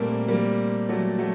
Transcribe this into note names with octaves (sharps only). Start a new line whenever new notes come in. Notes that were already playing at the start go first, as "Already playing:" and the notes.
Already playing: A#2 G3 A3 A#3 C4
G3 A#3
F#3 A3
F#3 A3